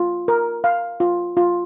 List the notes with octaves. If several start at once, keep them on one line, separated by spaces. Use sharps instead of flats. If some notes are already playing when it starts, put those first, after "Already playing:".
Already playing: F4
A#4
F5
F4
F4